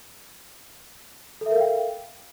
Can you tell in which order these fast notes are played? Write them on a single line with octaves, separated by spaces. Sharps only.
A4 E5 A#4 F5 G5